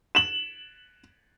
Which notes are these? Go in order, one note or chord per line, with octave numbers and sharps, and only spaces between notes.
E7 F#7